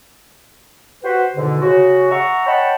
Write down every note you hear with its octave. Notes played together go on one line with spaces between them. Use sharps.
F#4 B4 C5
E2 G#2 B2 D3
C#3 F#4
E5 F#5 A#5 C#6
C#5 D#5 F#5 G5 A5 B5